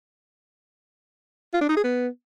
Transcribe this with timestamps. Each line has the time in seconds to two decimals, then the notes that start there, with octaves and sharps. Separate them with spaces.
1.54 F4
1.61 D4
1.69 D#4
1.76 G#4
1.84 B3